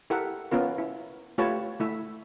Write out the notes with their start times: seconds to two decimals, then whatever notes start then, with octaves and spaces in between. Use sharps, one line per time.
0.10 E4 G4 A4 A#4 E5 F#5
0.51 B3 C#4 F4 A#4
0.78 E4
1.38 A3 F4 G4 B4 C#5 A5
1.80 A3 E4 E5